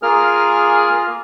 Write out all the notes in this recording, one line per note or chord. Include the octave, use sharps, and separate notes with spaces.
A#3 F4 G#4 A#4 F6